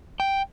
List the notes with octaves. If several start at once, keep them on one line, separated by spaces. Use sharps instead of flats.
G5